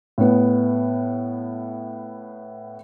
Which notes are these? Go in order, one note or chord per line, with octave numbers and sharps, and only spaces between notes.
A2 B3